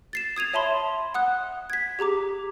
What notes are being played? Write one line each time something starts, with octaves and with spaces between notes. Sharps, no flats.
A6 C7 E7
D#6 G#6 D#7 F7
C#5 E5 A5 B5 C6
F#5 D#6 F#6
G#6 B6
G4 G#4 A#5 D6